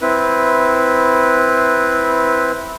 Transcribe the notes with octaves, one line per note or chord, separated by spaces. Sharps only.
C4 E4 B4